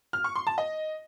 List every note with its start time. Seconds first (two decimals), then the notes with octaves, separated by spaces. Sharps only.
0.13 F6
0.24 C#6
0.36 C6
0.47 A5
0.58 D#5